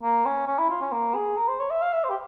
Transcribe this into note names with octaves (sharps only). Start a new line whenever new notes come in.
A#3
C#4
C#4
E4
F4
C#4
A#3
G#4
A#4
C5
C#5
E5
F5
E5
C5
G4